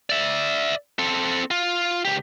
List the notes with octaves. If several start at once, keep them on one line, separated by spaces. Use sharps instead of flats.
D5 E5
C4 A4
F4
C#2 G4